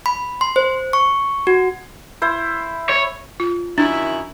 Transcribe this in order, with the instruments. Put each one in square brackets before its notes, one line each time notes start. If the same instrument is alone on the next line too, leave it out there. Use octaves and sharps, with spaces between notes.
[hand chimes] B5
C6
C5
C#6
F#4
[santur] E4 C5
[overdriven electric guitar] C#5
[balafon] F4
[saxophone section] F#2 D#3 E4 [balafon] D4